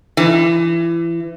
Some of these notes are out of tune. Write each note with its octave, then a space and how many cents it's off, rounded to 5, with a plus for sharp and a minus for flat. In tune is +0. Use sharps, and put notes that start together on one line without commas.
E3 +30